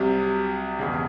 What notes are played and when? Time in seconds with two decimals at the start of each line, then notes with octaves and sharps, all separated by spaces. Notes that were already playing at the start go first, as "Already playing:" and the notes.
Already playing: C2 C3 F#3
0.79 E1 E2 C#3